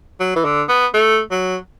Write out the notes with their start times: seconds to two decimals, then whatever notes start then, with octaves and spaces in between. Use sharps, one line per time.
0.20 F#3
0.36 E3
0.45 D3
0.69 B3
0.94 A3
1.31 F#3